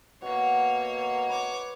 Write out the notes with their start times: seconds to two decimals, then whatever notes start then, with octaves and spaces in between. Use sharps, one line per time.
0.22 B2 A#3 F#4 C#5
1.29 B4 C#5 D6